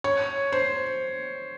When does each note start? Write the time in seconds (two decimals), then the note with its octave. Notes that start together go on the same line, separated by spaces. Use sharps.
0.04 C#5
0.52 C5